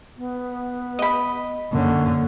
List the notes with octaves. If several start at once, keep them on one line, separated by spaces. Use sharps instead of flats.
B3
D#5 B5
F#2 D3 A#3 C#4